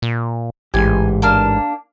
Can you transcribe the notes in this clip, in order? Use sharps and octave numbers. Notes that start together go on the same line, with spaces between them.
A#2
A1 G#2 E3 G4 G#5
A#3 D4 F6